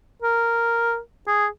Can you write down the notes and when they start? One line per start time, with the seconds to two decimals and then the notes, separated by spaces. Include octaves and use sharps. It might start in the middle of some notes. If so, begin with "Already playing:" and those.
0.23 A#4
1.27 G#4